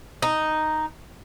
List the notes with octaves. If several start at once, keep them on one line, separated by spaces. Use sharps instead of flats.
D#4